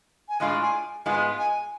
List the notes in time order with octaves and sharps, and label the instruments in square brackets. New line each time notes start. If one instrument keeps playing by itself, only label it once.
[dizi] G#5
[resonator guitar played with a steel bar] A2 G#3 D4 F4 G#4 [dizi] F5
[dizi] G#5
[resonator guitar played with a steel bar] G#2 G#3 B3 F4 [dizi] G#5
[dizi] G#5